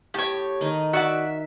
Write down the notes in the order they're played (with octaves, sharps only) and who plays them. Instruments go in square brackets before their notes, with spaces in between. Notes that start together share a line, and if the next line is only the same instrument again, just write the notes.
[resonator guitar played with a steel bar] A2 [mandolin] G4 C#5
[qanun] D#3 D#4
[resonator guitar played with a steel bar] F#4 D5 F#5 [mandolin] E5